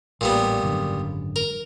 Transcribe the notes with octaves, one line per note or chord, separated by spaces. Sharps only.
A1 A#2 G3 B3
G#1 F#2 D3
A#4